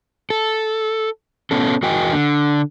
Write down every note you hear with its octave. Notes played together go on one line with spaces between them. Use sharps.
A4
B3 C#4 A4
E2 F#4 A#4 D#5 G5 G#5
D3